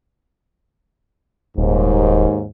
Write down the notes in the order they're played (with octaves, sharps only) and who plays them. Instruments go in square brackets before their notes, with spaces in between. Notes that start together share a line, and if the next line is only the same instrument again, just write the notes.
[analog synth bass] D#1 [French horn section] D#2 G#2